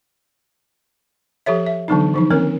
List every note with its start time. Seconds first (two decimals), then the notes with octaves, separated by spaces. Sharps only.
1.46 F3 G4 A4 C#5 E5
1.66 E5
1.88 D3 E3 F#3 B3 D4 D#4
2.14 E3 F3 D#4
2.30 D#3 A#3 C4 C#4 A#4 C#5